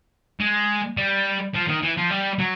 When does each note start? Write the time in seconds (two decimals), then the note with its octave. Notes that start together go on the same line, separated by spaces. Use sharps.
0.40 G#3
0.98 G3
1.54 F3
1.68 D#3
1.82 E3
1.97 F3
2.11 G3
2.39 F#3